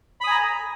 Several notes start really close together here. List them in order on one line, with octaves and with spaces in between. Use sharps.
B5 D#6 G#5 A#5